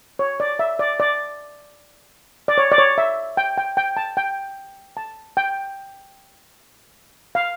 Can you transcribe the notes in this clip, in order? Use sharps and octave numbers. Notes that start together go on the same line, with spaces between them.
C#5
D5
E5
D5
D5
D5
C#5
D5
C#5
E5
G5
G5
G5
A5
G5
A5
G5
F5